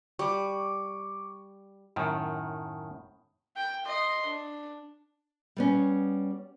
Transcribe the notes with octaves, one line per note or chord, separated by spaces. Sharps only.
G3 C#6 D6
F#2 A2 D#3
G5
D#5 C6
D4
G3 B3 C#4